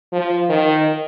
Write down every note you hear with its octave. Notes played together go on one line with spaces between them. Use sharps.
F3
D#3